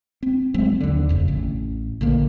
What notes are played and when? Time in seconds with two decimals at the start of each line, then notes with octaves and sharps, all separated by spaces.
0.23 C4
0.54 F#3 G#3 B3 C4
0.80 D#2 D3
1.09 F1 F2 C#3
1.28 A1
2.01 A#1 D3 A#3